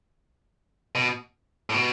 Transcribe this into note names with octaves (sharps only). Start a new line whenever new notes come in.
B2
A2
B2